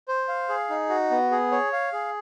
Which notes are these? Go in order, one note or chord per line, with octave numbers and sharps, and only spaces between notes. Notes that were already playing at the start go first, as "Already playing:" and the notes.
C5
F5
G#4
D#4
F#4
B3
G#4
C#5
F5
G#4